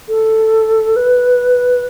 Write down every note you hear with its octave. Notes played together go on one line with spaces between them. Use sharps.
A4
B4